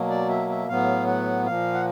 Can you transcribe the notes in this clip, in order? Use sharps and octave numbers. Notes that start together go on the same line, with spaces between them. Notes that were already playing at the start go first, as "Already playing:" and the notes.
Already playing: B2 F#3 A#3
D5
E5
E5
A2 F#3 B3 F5
F#5
A#2 F3 A#3 F5
F#5